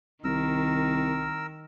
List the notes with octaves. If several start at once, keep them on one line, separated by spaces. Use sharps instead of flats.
C2 D#3 A#4 E6